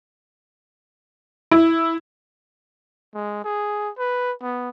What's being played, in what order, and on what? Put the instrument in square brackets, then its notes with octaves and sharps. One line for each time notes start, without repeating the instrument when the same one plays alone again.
[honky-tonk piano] E4
[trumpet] G#3
G#4
B4
B3